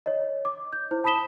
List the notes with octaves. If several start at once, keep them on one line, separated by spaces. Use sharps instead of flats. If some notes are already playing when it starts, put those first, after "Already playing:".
C#5 D#5
D6
G6
E4 C5
A5 B5 D#6 B6 E7 G7